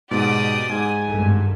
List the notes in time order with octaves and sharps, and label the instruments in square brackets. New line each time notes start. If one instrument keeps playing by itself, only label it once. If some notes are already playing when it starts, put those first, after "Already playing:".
[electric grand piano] G#2 B2 [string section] G4 D#6 [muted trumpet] D5
[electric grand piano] G#2 [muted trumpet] G#5
[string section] G#1 G2 A3